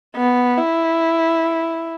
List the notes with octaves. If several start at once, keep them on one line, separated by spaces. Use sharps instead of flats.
B3
E4